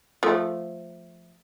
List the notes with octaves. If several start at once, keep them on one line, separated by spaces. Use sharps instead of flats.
F3 A3